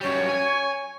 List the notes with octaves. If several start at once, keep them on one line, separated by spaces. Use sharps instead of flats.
F#2 G3 C#5
G#5